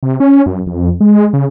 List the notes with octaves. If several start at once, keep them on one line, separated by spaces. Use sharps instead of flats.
C3
C#4
F#2
F2
G#3
C#3